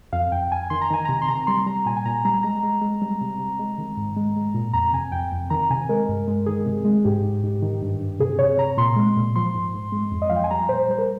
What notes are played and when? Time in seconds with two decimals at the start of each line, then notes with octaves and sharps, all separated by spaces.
0.13 F2 F5
0.32 F2 G5
0.51 F2 G#5
0.70 D#3 C6
0.81 A#5
0.90 D#3 G#5
1.05 C3 A#5
1.22 C6
1.28 C3 A#5
1.47 G3 C6
1.66 G3 A#5
1.86 A#2 G#5
1.97 G#5
2.05 A#2 A#5
2.25 G3 A#5
2.43 G#3 A#5
2.63 G#3
2.81 G#3
3.02 G3
3.21 C3
3.39 C3
3.59 G#3
3.78 D#3
3.97 G#2
4.16 G#3
4.36 G#3
4.54 A#2
4.73 F2 A#5
4.93 C3 G#5
5.12 F2 G5
5.32 F2
5.50 D#3 A#5
5.70 C3 G#5
5.89 G#3 A#4
6.08 G2
6.27 G#3
6.46 D#3 G#4
6.66 C3
6.85 G#3
7.05 G#2 G4
7.23 G#2
7.43 G#2
7.62 D#3
7.82 G2
8.00 G2
8.20 C3 G#4
8.39 C3 C#5
8.58 C3 A#5
8.77 A#2 C6
8.96 G#3
9.16 A#2
9.36 F3 C6
9.54 G#2
9.74 G#2
9.92 G#3
10.11 F2
10.22 D#5
10.30 F3 F5
10.36 G5
10.44 G#5
10.51 G3 A#5
10.69 A#2 C5
10.88 G3 C5
10.98 A#4